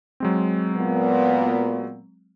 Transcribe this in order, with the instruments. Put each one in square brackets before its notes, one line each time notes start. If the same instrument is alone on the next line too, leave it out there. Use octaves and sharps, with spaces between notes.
[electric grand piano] F#3 G#3 C4
[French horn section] A#2 B3